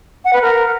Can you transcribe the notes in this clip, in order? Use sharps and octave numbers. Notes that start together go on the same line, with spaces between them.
F#5
B4
A#4